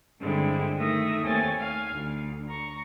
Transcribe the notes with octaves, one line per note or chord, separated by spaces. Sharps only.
G2 D3 G#3 C4 E4
D#3 A3 E5 D#6 A#6
D#2 A3 C4 C#5 G#5 A6
F5 G#5
D2
A#5 C#6